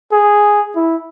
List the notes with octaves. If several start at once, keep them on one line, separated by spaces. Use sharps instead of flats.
G#4
E4